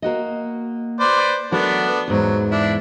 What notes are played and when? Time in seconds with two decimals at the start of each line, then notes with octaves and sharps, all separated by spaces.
0.02 A#3 F#4 D#5
1.00 B4 C5 D5
1.52 F#3 A3 B3 D4 A#4 B4
2.08 E2 G#2 F#3
2.51 D4 E4